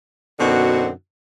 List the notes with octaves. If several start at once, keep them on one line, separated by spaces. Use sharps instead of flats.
F#2 B2 D3 C4 D#4 F#4